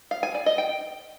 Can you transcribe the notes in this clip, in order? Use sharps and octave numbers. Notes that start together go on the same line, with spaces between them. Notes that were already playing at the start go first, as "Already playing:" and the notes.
F5
G#5
D5
D#5
G5